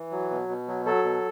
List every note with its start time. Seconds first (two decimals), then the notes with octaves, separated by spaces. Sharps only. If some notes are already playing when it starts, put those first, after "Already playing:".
Already playing: E3
0.11 F#3
0.31 B2
0.48 B2
0.68 F#3
0.85 F#3 A4
1.04 B2